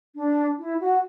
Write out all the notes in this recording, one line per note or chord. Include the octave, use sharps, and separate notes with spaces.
D4
E4
F#4